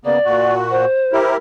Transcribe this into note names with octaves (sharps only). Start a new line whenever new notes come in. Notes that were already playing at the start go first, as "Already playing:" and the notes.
C#3 A#3 B3 D5
A#2 F#4
C5
E4 G4 A#4